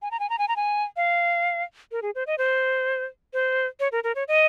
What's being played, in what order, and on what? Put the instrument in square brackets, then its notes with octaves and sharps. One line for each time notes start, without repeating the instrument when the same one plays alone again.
[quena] G#5
A#5
G#5
A#5
G#5
A#5
G#5
F5
A#4
G#4
C5
D#5
C5
C5
C#5
A#4
A#4
C#5
D#5